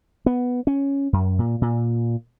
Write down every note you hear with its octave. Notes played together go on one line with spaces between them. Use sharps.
B3
C#4
F#2
A#2
A#2